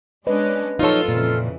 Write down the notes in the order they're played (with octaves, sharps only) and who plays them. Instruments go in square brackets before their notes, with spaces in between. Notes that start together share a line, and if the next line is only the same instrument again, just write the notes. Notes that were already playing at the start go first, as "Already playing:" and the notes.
[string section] G#3 C#4 D4 [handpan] B4 D#5
[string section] A#2 F3 F#3 [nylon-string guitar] D#4 C#5 [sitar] F4 A4
[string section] F2 C#3 E3 [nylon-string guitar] A#2